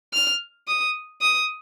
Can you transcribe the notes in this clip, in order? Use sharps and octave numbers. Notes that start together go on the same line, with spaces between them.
F6
D#6
D#6